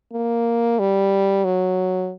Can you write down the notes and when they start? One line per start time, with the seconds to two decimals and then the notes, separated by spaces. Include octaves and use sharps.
0.13 A#3
0.79 G3
1.44 F#3